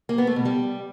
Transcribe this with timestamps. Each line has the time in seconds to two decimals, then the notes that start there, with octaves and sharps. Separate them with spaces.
0.09 A#3
0.18 B3
0.27 A3
0.36 B2
0.45 G3